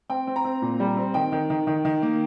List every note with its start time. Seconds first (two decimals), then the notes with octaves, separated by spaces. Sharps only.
0.09 C4 G5
0.27 C4
0.36 A#5
0.45 C4
0.62 A#2
0.80 G3
0.97 C4
1.14 D#3 G5
1.32 D#3
1.50 D#3
1.67 D#3
1.85 D#3
2.02 A#3